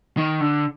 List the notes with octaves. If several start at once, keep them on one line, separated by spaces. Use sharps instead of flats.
D#3
D3